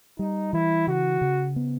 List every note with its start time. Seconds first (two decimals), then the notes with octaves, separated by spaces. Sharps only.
0.18 G3 D#4
0.53 E3 E4
0.87 C#3 F#4
1.21 C#3
1.56 B3